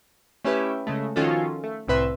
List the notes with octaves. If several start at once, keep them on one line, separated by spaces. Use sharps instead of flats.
A3 C#4 E4 G4 B4 E5
C#3 G#3 A3
D#3 F3 C#4 F4 F#4 A4
A3
C2 A2 C4 B4 E5 C6